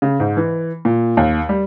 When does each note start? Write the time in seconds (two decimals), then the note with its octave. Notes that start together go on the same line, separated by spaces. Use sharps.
0.02 C#3
0.20 G#2
0.37 E3
0.85 A#2
1.17 D#2
1.49 G3